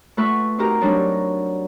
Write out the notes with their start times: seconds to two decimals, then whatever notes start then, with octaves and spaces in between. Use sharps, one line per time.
0.17 A3 F4 B4 F#5 C#6 E6
0.58 C4 D#4 F#4 G4 A#4 A#5
0.81 F#3 G3 C4 D4 D#4